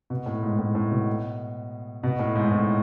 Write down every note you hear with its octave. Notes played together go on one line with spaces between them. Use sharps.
B2
A2
G#2
A2
A2
B2
B2
A2
G#2
A2